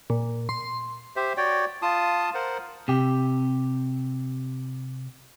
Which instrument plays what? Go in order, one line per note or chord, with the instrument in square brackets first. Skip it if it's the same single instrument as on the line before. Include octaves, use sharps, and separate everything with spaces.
[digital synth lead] A#2
C6
[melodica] G4 C5 E5
F#4 C#5 D5 G5
F4 A5 D#6
A#4 C5 F#5
[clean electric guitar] C3 G4